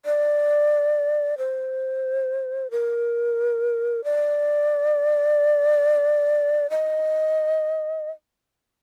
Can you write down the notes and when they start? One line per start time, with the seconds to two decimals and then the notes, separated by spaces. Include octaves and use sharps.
0.05 D5
1.38 C5
2.71 A#4
4.04 D5
6.70 D#5